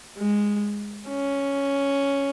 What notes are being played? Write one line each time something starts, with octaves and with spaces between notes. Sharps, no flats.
G#3
C#4